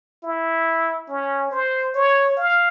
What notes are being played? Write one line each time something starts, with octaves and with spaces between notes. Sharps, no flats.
E4
C#4
C5
C#5
F5